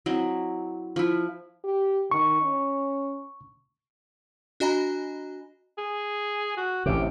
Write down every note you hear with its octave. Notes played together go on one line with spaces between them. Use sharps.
F#3 C4 E4 D#5
F3 E4
G4
D#3 C#6
C#4
D4 F#4 D#5 G#5 A#5 B5
G#4
F#4
A1 C3 G4